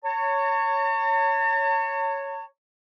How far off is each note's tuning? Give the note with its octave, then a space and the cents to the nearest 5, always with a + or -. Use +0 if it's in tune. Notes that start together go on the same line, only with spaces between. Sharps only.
C#5 +0 A5 +45